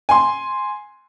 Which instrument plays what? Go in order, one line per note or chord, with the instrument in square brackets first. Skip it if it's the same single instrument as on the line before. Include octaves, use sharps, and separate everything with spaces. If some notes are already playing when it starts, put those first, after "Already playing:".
[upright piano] G#5 C6